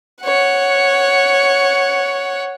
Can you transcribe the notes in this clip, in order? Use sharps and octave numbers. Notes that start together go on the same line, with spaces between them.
C#5 F#5